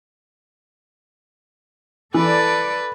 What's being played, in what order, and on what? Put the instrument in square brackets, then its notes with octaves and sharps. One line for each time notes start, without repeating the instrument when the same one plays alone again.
[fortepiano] E3 [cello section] A4 D5 [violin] B4